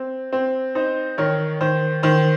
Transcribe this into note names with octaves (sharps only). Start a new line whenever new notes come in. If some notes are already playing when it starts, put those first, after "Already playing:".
Already playing: C4
C4
D#4 C5
D#3 A#4 C#5
D#3 C5
D#3 C5